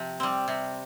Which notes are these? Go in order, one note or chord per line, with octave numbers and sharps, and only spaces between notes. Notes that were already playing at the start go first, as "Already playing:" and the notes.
Already playing: C3 F3
G3 C4
C3